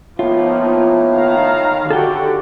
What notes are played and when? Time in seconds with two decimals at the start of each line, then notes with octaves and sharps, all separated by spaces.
0.19 A2 F3 A#3 B3 D#4 F4
1.14 D#3 F5 A#5
1.91 D3 F#4 G4 A4 G5